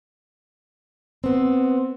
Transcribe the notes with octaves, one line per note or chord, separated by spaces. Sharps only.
B3 C4